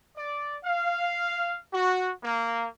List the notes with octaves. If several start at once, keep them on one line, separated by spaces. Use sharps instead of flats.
D5
F5
F#4
A#3